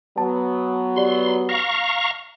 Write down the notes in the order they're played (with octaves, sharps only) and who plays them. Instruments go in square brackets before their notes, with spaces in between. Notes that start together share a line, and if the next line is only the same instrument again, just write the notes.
[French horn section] F#3 B3 [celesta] A5
[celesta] G4 D5 [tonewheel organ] C6
[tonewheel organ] F5 A#5 C#6 [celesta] A#6